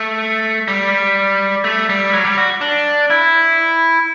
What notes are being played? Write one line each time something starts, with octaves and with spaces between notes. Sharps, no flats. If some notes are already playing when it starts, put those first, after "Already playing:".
Already playing: A3
G3
A3
G3
F#3
G3
F#4
D4
E4